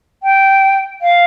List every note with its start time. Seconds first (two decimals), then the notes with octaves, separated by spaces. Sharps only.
0.23 G5
1.02 F5